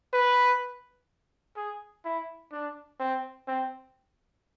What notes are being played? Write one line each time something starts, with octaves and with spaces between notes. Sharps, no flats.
B4
G#4
E4
D4
C4
C4